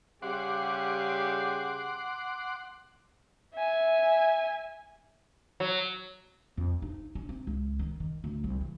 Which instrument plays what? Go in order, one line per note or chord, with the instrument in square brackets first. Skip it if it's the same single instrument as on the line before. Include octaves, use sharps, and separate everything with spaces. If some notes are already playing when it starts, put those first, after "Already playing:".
[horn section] C#3 G3 G4 [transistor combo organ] F#5 C6 D6
[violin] E5 G#5
[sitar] F#3
[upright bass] F2
D#4
C#4
C4
C#2
D#3
D#3
D2
C2
E3